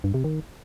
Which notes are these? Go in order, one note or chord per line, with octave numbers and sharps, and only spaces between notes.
G2
C3
D#3